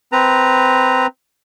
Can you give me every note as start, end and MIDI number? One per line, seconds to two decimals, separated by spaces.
0.12 1.07 60
0.12 1.07 71
0.12 1.07 82